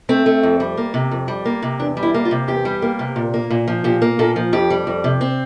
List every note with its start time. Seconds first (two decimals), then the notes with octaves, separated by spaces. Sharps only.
0.09 A3 C4
0.26 A3
0.43 F2
0.60 G3
0.77 A#3
0.94 C3
1.11 F2
1.28 G3
1.45 A#3
1.62 C3
1.80 E2 D4
1.97 G3
2.03 E4
2.14 A#3
2.25 F4
2.31 C3
2.48 E2 G4
2.65 G3
2.82 A#3
2.99 C3
3.16 A#2
3.34 A#3
3.51 A#2
3.67 F3
3.84 A#2 G4
4.02 A#3
4.19 A#2 A4
4.36 F3
4.53 F2 G4
4.70 G3
4.87 F2
5.04 C3
5.21 C4